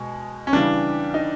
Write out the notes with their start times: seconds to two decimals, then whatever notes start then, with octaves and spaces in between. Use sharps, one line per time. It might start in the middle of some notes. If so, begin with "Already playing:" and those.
Already playing: B2 G#3
0.47 C#4
0.53 C#3 E3 G3 D4
1.14 D#4